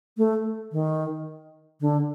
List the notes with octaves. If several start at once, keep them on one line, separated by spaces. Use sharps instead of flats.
A3
D#3
D3